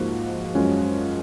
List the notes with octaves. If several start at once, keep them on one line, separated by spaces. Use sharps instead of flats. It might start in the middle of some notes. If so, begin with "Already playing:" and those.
Already playing: G#2 F3 A#3 D#4 F#4
F#2 F3 G#3 C#4 F#4